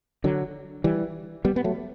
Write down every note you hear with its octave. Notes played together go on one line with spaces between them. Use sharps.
D3 F#3
E3 G3
G3 B3
B3
F#3 A3